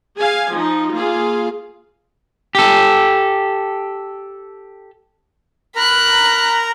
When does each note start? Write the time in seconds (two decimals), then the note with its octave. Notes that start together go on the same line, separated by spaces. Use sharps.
0.18 G#4 F5 G#5
0.54 F3 D#4
0.95 A#3 F4 G#4 F5
2.55 G4 A4
5.76 A#4 A#5 B5 F#6